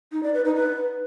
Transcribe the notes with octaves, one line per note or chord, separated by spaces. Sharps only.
D#4
D5
B4
D#4
B4